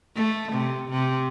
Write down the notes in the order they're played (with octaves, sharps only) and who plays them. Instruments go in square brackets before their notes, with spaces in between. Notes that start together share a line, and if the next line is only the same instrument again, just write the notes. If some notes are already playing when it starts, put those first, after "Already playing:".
[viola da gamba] A3
C3
C3